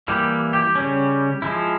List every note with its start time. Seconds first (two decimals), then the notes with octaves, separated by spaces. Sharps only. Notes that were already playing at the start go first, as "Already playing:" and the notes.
0.08 E3 G3 A#3 E4 G4
0.53 G4
0.75 C#3 G3 C#4
1.42 F3 G#3 E4